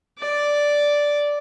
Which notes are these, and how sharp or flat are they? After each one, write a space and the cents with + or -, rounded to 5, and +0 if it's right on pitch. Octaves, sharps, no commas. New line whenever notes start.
D5 -5